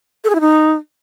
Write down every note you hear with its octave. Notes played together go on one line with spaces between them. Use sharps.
A4
G#4
E4
D#4